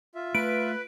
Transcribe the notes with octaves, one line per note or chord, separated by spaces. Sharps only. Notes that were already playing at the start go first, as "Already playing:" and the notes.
F4 E5
A3 B4 D7